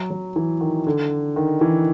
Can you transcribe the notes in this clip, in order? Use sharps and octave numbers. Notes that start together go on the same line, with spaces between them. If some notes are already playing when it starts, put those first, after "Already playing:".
Already playing: F#3
F#3
E3
D#3
D3
D#3
E3